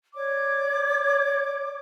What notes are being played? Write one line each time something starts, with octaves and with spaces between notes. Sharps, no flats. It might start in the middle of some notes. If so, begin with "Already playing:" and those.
C#5 D5 D6